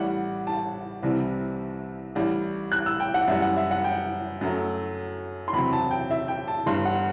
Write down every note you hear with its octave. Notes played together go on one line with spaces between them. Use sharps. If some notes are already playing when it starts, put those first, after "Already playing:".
Already playing: A1 A2 G3 F#5
A5
C2 C3 E3 G3
A1 A2 G3
F#6
E6
G5
F#5
F#2 E3 G3 E5
F#5
E5
F#5
G5
F#2 F#3 A3
C6
E2 C3 F#3 B5
A5
G5
E5
G5
A5
G1 G2 E3 G3 C6
F#5